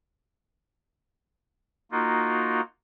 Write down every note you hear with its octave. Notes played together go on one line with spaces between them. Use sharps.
A#3 D#4 F4 F#4